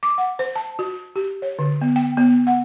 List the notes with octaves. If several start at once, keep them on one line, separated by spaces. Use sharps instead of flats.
D6
F#5
C5
A5
F#4
G4
C#5
D3
B3
G5
B3
F#5